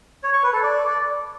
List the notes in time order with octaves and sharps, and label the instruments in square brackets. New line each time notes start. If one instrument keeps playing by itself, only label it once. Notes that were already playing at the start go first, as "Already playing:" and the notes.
[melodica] C#5
C#6
B4
A4
D5